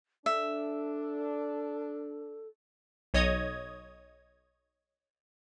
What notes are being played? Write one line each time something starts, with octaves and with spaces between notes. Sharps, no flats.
D4 A4 E5
B1 C#5 D#5 D#6 G#6